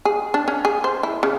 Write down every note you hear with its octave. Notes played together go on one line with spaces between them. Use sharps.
G#4
D4
C#4
G#4
C5
E4
C#3